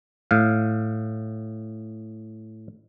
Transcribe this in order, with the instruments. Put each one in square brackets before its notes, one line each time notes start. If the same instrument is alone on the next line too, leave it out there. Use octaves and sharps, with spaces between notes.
[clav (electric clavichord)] A2 F5